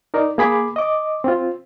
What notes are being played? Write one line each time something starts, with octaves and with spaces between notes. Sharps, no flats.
D#4 A#4 D5
A#3 G#4 B5 D6
D#5 D6
C4 F4